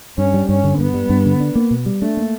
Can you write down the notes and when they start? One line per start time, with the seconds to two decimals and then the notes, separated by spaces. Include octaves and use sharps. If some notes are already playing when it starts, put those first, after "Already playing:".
0.18 G2 C#4
0.34 G3
0.49 G2 C#4
0.64 D3
0.79 G2 B3
0.94 G3
1.10 G2
1.26 D3
1.40 D4
1.55 A#3
1.71 B2
1.86 G3
2.01 A3 D4
2.17 A#3